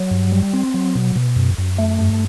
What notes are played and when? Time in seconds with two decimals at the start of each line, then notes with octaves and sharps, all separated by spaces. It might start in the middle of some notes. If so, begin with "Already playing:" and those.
Already playing: F#3
0.11 G2
0.32 G3
0.53 C4
0.74 F#3
0.95 B2
1.16 B2
1.36 F#2
1.58 F#2
1.78 A3
1.99 G2